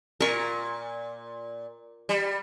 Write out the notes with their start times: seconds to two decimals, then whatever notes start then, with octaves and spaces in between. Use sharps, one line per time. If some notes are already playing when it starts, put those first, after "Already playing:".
0.20 A#2 A#4 C#6
2.09 G3